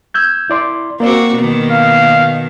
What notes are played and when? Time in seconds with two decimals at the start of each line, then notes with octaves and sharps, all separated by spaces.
0.14 E6 G6 G#6
0.50 E4 D5 C6
1.00 A#3 C4 F#4 D5
1.35 B2 D#3
1.71 F5